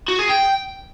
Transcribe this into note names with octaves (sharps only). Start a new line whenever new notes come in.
F#4
G#4
G5